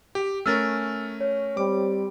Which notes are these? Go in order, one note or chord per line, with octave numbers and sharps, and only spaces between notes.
G4
A3 C#4 A#4 E6 F6 A6
C#5
G3 C4 D6